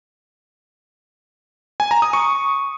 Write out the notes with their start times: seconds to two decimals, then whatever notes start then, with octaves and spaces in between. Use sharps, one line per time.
1.80 G#5
1.91 A#5
2.02 D#6
2.13 C#6